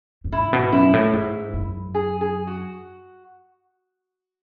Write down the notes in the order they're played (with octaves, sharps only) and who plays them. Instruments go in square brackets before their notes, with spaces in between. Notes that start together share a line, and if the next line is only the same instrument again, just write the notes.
[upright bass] F#2
[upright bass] G#2 [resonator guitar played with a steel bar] E4
[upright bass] B2
[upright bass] F#2 [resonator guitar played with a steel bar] E4
[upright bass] A2
G#2
F#2
[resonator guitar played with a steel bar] G#4
G#4
F#4